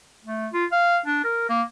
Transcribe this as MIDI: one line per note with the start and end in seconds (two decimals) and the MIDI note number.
0.25 0.48 57
0.53 0.66 65
0.72 0.99 77
1.06 1.21 62
1.24 1.45 70
1.49 1.62 58